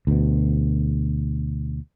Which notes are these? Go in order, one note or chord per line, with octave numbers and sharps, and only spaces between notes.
D2 B2